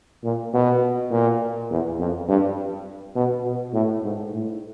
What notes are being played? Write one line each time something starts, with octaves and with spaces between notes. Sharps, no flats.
A#2
B2
A#2
E2
F2
G2
B2
B2
A2
G#2
A2